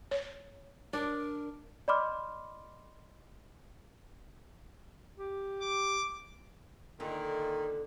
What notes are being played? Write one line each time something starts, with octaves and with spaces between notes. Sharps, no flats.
C#5
D4 A#4
D5 D#5 B5 C6 D6 F6
G4
D6
A#2 D3 D#3 D#4